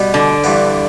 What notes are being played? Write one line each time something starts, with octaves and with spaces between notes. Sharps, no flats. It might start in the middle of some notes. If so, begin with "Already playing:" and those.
Already playing: B2 G3 B3
D3
G2 E3 B3